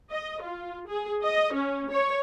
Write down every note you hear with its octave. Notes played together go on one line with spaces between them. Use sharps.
D#5
F4
G#4
D#5
C#4
C#5